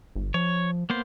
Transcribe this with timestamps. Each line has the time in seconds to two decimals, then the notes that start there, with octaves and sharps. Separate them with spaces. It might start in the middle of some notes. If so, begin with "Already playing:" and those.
0.16 G1
0.34 F3 C#5
0.90 A#3 B3 C5